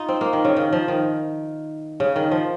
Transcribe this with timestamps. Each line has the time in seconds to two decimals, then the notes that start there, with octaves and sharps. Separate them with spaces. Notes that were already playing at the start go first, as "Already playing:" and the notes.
Already playing: D#4 F4
0.08 C4
0.21 A#3
0.33 D#3
0.45 C#3
0.56 D#3
0.73 F3
0.88 D#3
2.00 C#3
2.16 D#3
2.31 F3